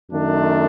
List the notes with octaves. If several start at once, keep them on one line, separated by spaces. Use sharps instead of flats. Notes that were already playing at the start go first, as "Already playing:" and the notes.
F#2 D#3 A3 D4